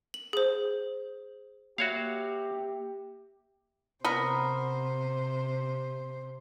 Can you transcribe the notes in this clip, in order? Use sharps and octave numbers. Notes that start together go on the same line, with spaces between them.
F#7
G#4 C5
A#3 F#4 G4 C#5 E5 F5
C3 B3 A#4 C5